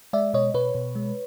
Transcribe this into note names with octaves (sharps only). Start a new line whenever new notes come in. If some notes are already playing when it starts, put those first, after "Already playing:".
G#3 D5 E5
B2 C#5 D#5
B2 B4 C#5
B2
G#3